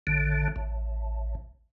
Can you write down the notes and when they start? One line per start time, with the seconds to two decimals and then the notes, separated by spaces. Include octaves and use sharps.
0.07 A1 D3
0.56 A1